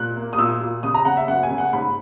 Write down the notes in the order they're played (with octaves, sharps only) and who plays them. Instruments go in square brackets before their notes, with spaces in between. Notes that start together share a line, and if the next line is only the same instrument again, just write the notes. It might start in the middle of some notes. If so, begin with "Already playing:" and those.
Already playing: [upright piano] A#2 F#6
A#3
D#6
A#2 E6
A#2
C#3 D#6
A#5
C#3 F#5
E5
F#2 F#5
G#5
C#3
F#5
G#2 B5